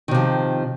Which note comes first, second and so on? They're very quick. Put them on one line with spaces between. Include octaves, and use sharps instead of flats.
D#3 C3 F3